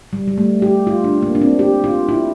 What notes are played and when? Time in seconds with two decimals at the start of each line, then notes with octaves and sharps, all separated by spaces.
0.13 G3
0.28 G3
0.38 A3
0.62 G4
0.87 F4
1.04 D4
1.23 A#3
1.35 D4
1.41 C4
1.59 G4
1.84 F4
2.09 E4